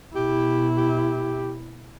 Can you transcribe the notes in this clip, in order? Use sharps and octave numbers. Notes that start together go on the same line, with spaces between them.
B2 E4 G4
G4